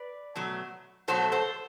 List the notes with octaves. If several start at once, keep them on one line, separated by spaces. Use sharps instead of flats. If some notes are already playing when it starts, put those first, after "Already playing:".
Already playing: B4 D5
B2 F#3 A3
B2 F#3 A3 A4 C5
A4 C5